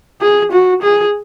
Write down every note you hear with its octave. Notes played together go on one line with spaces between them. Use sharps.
G#4
F#4
G#4